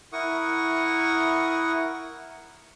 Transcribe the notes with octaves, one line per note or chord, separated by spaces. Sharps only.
E4 A#4 F#5 C#6 D#6